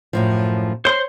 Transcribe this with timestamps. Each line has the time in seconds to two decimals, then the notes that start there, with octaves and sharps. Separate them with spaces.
0.13 F#2 A2 F3
0.85 C5 C#5 C6